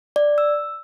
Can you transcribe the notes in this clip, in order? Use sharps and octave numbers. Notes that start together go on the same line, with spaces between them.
D5
E6